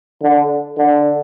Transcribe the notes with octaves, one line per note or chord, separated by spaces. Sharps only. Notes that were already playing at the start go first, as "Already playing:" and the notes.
D3
D3